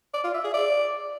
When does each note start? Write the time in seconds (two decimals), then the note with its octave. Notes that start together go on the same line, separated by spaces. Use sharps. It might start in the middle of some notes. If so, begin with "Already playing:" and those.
0.14 D5
0.24 F4
0.34 E5
0.44 G#4
0.54 D5